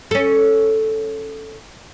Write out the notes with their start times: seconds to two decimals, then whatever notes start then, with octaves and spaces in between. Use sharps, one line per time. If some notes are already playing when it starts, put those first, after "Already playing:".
0.11 C#4 A4